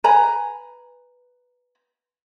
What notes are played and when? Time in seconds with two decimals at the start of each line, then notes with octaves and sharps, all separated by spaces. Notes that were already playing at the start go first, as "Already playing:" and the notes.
0.04 B4 G#5 A#5 B5